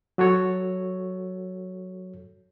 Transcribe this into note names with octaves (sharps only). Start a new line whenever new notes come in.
F#3 F#4 A4 C#5